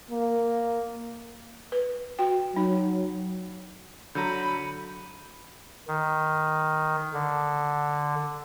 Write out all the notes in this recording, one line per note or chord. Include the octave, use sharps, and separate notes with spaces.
A#3
B4
F#4 G5
F#3 D#4
D3 F#3 A#5 B5 G6 C#7 D#7
D#3
D3